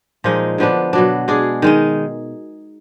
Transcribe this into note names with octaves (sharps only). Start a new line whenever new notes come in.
A#2 F3 G#3 D#4
D3 F3 B3 D4
B2 F#3 D4
G#3 D4 G#4
D#3 G#3 D#4